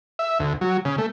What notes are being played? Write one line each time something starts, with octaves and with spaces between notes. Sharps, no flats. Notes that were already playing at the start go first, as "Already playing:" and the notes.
E5
D2
F#3
C#3
A3